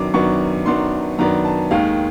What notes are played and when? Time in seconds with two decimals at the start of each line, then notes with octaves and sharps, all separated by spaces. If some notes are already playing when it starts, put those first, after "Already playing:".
Already playing: F#2 D#3 F#3 B3 D4 D6
0.14 F#2 D#3 F#3 B3 D4 C#6
0.66 F#2 D#3 F#3 B3 D4 C6
1.18 F#2 D#3 F#3 B3 D4 A#5
1.45 A5
1.71 D#2 D#3 G#3 F5